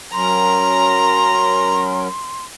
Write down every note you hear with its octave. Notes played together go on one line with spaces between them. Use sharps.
F#3 C#4 A#4 A#5 C6